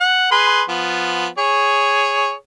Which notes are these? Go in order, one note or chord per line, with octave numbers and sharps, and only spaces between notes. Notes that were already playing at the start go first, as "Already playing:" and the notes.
F#5
G#4 B4 C6
F3 B3
G#4 C#5